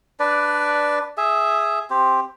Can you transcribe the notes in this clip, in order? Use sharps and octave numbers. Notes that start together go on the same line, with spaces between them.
D4 B4 D5
G#4 E5
C4 G4